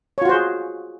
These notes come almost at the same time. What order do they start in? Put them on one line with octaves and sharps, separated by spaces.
C#5 F4 F#4 C5 G#4